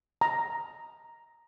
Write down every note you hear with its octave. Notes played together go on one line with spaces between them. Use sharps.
A#5